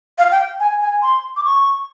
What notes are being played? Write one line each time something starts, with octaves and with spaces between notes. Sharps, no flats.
F5
G5
G#5
G#5
C6
D6
C#6